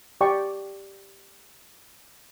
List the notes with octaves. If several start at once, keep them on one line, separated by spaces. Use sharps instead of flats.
G4 D5 G5 C#6